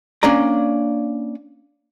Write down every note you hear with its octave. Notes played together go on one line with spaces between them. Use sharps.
A#3 C#4 D4 D5 A#5